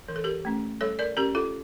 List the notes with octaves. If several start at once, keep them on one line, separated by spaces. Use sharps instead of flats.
E3 A#4
A4
G4 A#4
A3 C#4
G3 A4 C#5
A#4 D5
C#4 G4 A#4
F4 A4